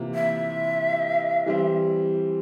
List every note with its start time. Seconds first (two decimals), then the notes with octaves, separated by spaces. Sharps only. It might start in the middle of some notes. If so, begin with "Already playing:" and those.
Already playing: C3 E3 A#3 F4
0.15 E5
1.46 E3 G3 C4